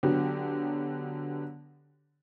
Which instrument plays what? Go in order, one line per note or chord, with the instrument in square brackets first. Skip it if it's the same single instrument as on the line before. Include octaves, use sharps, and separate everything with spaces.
[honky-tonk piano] D3 F#3 B3 G4